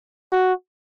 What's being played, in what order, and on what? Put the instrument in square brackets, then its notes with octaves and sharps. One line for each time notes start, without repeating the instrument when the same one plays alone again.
[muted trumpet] F#4